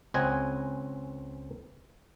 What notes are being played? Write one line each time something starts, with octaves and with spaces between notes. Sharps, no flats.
C#2 C4 C#4 D#5 F#5 G#5